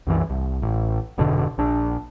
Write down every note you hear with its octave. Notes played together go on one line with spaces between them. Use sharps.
C2 F#2 E3
C2
A1
F1 G#2 B2 D3
A#1 D4